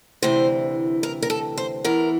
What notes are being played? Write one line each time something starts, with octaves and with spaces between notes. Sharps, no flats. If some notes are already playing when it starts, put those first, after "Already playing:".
D2 C3 E3 C5
A#4
A#4
A4
C5
E2 E3 A#4